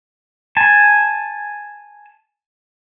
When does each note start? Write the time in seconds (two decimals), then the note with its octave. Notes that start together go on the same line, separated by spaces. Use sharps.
0.57 G#5 A5